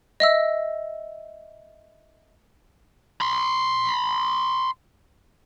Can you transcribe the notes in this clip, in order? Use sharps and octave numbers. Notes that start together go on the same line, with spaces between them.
D#5 E5 E6
B5 C6